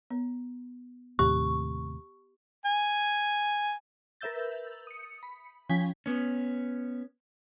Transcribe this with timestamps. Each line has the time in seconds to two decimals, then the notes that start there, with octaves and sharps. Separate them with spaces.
0.10 B3
1.19 D#2 A2 C3 G4 C#6
2.65 G#5
4.21 A#4 B4 E5 E6 G6 A6
4.87 D#6 C#7
5.23 B5
5.69 F3 C#4 G5 G#5 B6
6.06 B3 C#4